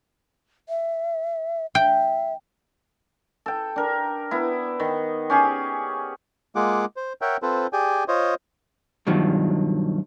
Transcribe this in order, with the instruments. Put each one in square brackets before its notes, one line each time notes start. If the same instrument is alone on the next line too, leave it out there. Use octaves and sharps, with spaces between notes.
[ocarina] E5
[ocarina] E5 [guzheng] G5
[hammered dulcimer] A4 G5
D4 A#4
B3 E4
D#3
C#4 G4 G#4
[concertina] G#3 A#3 F4 G#4 F#5 D6
C5
A#4 C#5 E5 F#5 G5
C4 F4 A4 B4 C5
G4 G#4 D5 G5 G#5
F4 C5 C#5 D#5
[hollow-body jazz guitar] G2 B2 D#3 F3 F#3